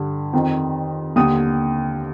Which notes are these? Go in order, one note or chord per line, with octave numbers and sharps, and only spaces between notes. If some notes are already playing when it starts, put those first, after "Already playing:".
Already playing: G2 D3
F2 D#3
D#2 D3 D#6